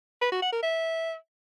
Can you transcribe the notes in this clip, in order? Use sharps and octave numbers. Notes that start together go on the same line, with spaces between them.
B4
F#4
F#5
A#4
E5